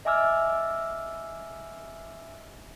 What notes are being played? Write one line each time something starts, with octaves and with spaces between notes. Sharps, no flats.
D#5 E5 G#5 D6 E6 F6